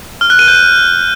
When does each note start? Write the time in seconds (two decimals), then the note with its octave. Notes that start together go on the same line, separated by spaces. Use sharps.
0.21 F6
0.30 F#6
0.39 D#7
0.48 G6